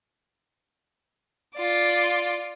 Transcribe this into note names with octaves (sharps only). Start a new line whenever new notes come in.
F4 D5